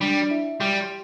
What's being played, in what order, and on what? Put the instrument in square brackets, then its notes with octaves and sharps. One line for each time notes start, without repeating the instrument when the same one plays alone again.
[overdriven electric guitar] G3 [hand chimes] D4 D5
[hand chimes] E4 E5
[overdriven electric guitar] G3 [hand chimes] G4 G5
[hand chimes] C6